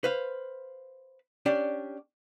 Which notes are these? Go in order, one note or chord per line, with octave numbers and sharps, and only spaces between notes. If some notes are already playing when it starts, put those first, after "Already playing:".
B4 C5 F5
C#4 D4 G4 D5